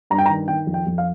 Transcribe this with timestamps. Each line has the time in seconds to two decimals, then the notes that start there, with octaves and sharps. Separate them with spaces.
0.10 G2 A#5
0.18 G5
0.26 A#5
0.29 D#3
0.48 D#3 G5
0.67 F2
0.74 G5
0.86 F2
0.98 F5